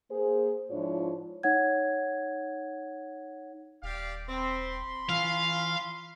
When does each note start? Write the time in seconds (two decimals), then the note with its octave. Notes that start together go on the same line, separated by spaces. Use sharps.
0.11 A#3 G#4 C5
0.71 G#2 F3 D4 E4 F4 C#5
1.43 D#4 C#5 F#5 G#6
3.83 D#1 G4 D5 F5
4.29 C4 B5 C6
5.09 E3 C#4 E4 F4 F5